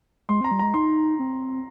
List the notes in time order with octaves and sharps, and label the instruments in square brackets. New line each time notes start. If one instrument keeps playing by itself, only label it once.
[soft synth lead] G#3 [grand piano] C6
[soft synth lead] C4 [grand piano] A#5
[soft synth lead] G3
[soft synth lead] G#3 [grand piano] A#5
[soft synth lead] D#4 [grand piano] C6
[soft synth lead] C4